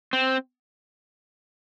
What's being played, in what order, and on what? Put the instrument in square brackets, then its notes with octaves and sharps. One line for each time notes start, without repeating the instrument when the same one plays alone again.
[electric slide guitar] C4